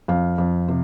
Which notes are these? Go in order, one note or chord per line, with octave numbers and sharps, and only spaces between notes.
F2 F5
F2
C3